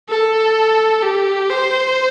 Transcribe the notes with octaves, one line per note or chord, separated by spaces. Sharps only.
A4
G4
C5